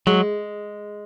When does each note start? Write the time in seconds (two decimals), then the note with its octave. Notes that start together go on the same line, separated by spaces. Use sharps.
0.07 F#3 G#3